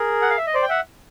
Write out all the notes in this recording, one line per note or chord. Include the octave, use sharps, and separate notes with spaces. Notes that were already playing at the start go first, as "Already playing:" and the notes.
Already playing: G#4 A#4
F#5
F5
E5
D#5
C5 D5
G5
E5 F#5